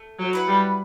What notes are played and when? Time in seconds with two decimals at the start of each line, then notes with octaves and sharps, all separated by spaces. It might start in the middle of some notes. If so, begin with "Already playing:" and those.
Already playing: A3
0.19 F#3
0.33 E4 B4 F#5
0.48 G3